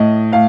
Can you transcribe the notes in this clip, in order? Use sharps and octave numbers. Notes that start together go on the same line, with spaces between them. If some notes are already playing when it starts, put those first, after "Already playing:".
Already playing: A2 D#5
A2 F5